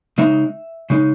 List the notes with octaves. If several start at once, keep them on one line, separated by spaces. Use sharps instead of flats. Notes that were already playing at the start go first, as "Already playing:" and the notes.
C#3 G#3 D#4 E5
C#3 G#3 D#4